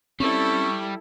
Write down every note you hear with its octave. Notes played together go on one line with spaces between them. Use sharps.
G3 C4 C#4 E4 A4 C#6